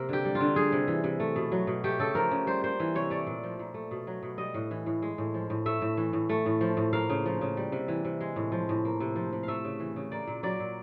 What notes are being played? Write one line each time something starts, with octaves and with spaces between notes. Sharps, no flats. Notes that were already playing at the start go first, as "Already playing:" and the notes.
Already playing: C3 A#3 A#4
D3 G4
G3
F4
D3
G3 G#4
C3
E3
C3
A3
B2
F#3
B2
A3 G4
C#3 A4
F3 A#4
C#3
G3 C5
A#3 C5
E3
C3 C#5
A3 D5
A#2
F3
A#2
A3
B2
F#3
B2
G3 D#5
A2
E3
A2
G#3
A2
F3
A2
A3 E5
A2
E3
A2
A3
A2
F3
A2
A#3 F5
C#3
F3
C#3
G3
C3
E3
C3
G#3
A2
F3
A2
A#3
C3
F3
C3
A3 E5 F5
C#3
E3
C#3
A#3 D5
A#2
F#3 D5
A#2